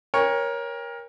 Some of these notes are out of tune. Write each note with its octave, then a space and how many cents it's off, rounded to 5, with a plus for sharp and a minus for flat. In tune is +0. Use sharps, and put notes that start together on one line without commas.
A#4 +20 C#5 +0 G5 +40